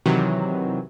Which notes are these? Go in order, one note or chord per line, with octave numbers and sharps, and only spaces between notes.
C3 D#3 E3 F#3